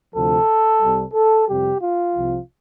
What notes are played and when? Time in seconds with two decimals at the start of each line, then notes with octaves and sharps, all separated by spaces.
0.14 D2 C3 F3 A4
0.81 C2 C3 G3
1.14 A4
1.47 F2 C3 G3 G4
1.81 F4
2.14 C2 C3 F3